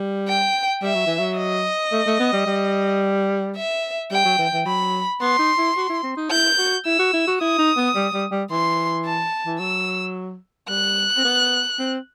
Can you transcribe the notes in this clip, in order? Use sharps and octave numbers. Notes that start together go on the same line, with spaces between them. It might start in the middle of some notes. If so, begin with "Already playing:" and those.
Already playing: G3
G5
G3 E5
F#3
E3
F#3
D#5
A3
A3
B3
G3
G3
E5
G3 G5
F#3
E3
E3
F#3 B5
B3 C6
D#4
E4
F#4
E4
C4
D#4
E4 G6
F#4
E4 E6
F#4
E4
F#4
E4 D#6
D#4
B3
G3
G3
G3
E3 C6
A5
E3
F#3 E6
G3 F#6
C4
B3
C4